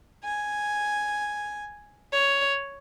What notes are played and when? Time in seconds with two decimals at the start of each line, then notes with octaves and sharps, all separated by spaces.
0.24 G#5
2.12 C#5